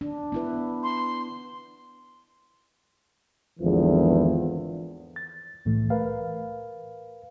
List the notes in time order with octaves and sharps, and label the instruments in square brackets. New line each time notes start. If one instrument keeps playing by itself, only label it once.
[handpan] D4
B3 E4 B4
[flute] C6
[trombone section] G#1 E2 D3 E3 F3
[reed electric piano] A6
C2 A2 E3 A3
A#4 B4 F5